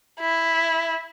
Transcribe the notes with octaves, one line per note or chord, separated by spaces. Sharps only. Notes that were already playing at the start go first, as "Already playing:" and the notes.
E4